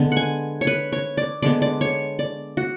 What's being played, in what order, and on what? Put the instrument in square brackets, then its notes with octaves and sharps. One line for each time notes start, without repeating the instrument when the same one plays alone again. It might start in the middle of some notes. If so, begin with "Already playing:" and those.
Already playing: [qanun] D3 G#3 B3
F#5 G#5
C#5
B4
C#5
D5
D3 G#3 B3 D5
D5
C#5
D5
F#4